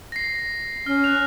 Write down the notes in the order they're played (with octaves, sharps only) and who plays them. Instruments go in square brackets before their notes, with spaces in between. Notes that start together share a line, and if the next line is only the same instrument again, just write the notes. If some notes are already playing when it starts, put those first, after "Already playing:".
[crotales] A#6 C7
[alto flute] C#4 [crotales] F6
[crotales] F#6 F7